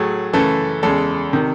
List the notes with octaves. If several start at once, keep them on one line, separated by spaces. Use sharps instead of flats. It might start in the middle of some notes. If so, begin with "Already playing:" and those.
Already playing: A2 F#3 A3 G#4
F#2 C#3 E3 A3 A4
E2 C#3 G#3 A4
C3 D#3